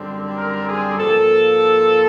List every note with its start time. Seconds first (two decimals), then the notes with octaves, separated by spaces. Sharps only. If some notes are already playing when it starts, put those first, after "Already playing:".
Already playing: F#2 D3 G3 C4
0.35 A#4
0.65 G#4
0.97 G#2 F3 A#3 A4